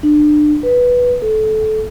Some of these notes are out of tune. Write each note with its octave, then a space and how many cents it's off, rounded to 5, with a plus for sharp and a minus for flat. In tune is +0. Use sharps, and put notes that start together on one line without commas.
D4 +30
B4 -5
A4 -20